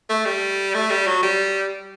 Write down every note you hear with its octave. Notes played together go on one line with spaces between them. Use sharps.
A3
G3
A3
G3
F#3
G3